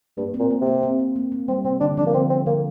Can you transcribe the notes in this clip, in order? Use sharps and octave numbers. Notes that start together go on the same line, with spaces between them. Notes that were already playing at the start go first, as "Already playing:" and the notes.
G2 A#3
C4
A#2
A#3
C3
A#3
C4
C4
A#3
A#3
G3 C4
C3 C4
D3 D4
F3 D4
A#3
D3 C4
C4
D3 A#3